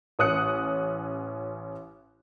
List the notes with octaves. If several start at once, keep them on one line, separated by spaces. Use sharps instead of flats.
A1 C#4 D#6 F#6 C#7